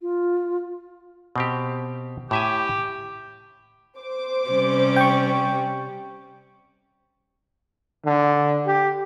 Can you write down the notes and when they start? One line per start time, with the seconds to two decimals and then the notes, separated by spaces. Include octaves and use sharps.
0.02 F4
1.36 B2 C4 G4
2.31 A2 G4 E5 G#5
3.99 C5 D6
4.50 C3 G3 C#4
4.96 G5 C#6
8.05 D3
8.66 G4